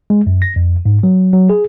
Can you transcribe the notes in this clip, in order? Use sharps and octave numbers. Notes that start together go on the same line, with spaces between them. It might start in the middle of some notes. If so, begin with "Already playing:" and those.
G#3
F#2
A#6
F2
G#2
F#3
F#3
G#4